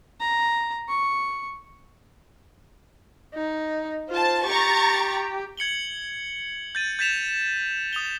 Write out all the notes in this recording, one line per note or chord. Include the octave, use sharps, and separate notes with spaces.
A#5
C#6
D#4
F4 C5 A5
G4 A#5 C#6 A6
G#6 C#7 F#7 G7
G6 A6 D#7
G6 A6 B6 E7 F7
D#6 F7 G7